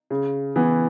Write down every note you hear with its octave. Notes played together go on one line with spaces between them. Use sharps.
C#3
E3 B3 E4